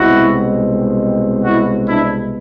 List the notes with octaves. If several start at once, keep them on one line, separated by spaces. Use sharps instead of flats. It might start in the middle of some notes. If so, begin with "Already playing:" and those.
Already playing: C2 B2 G#3 C4 E4 F#4
E4 F#4
D4 E4